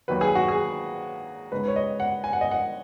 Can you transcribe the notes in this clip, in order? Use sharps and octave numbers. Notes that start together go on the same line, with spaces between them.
D#2 D#3 F#3 B4
G#4
F#4
G#4
C#3 G#3 B3 D#4 B4
C#5
D#5
F#5
G#5
F#5
D#5
F#5